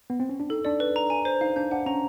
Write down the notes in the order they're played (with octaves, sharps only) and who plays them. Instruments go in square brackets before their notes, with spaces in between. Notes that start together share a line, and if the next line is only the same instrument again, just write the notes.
[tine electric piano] B3
C4
C#4
D4
[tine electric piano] D#4 [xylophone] A4
[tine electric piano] D4 [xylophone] D5
[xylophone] B4
A#5
G#5
C5
[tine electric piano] D#4 [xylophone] F5
[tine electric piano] D4 [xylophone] G6
[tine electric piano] D4 [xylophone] F#5
[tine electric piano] C#4 [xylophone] A#5